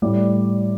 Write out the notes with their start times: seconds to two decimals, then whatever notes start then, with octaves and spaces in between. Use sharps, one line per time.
0.02 A2 G3 D5